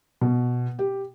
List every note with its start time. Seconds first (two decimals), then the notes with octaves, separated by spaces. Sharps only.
0.21 B2
0.79 G4